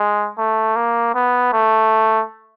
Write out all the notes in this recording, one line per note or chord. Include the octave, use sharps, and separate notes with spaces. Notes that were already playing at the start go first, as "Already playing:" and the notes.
Already playing: G#3
A3
A#3
B3
A3